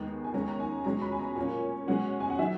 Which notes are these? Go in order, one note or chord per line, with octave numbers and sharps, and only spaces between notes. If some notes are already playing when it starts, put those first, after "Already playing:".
Already playing: D#2 D#3 G#3 B3 A#5
G#5
D#2 D#3 G#3 C#4 A#5
A#5
G#5
B2 G#3 C#4 A#5
B5
G#5
A#5
A#2 A#3 C#4 G#5
B2 G#3 C#4 F#5
G#5
F#5
D#3 F#3 E5